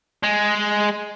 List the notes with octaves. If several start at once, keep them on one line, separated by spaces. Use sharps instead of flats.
G#3